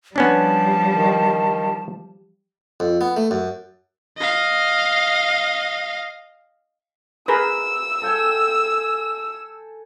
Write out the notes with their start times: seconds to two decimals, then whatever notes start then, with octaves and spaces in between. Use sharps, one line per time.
0.16 F3 G3 B3 C#4 D4 A5
0.93 D#3
2.80 F2
3.01 B3
3.17 A3
3.31 F#2
4.18 D#5 F5
7.28 G#4 A#4 B4 E6
8.02 A4 G5 G#5